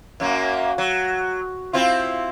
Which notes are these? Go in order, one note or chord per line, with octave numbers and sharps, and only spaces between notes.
F#2 F#3 A#3
F#3
C4 E4 F4